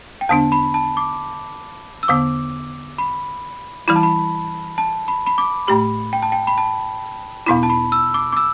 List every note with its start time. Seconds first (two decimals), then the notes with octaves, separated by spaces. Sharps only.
0.21 G5
0.29 E2 D3 B3 D4 A5
0.52 B5
0.74 A5
0.97 D6
2.03 E6
2.08 E2 D3 B3 D6
2.98 B5
3.88 E3 G3 E4 B5
3.96 A5
4.03 B5
4.78 A5
5.08 B5
5.26 B5
5.38 D6
5.68 A2 A3 G4 B5
6.13 G5
6.22 A5
6.32 G5
6.47 B5
6.58 A5
7.46 E2 B2 B3 E4 B5
7.63 A5
7.70 B5
7.92 E6
8.14 D6
8.32 D6
8.37 E6